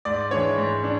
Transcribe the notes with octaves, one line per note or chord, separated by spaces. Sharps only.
G#2 D5
E3 G#3 D4 C#5
G#2
D4